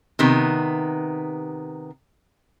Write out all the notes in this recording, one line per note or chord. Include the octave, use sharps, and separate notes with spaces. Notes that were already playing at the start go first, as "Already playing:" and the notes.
C3 D#3 B3